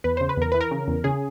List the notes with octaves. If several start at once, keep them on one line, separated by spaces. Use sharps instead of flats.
E2 B4
C#3 C5
B4
E2 A#4
E3 B4
A#4
C#3
E2
C#3 G#4